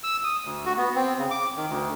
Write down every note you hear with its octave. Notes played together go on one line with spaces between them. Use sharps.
E6
D#6
D2
F#4
B3
C4
C#3
D6
D#3
D2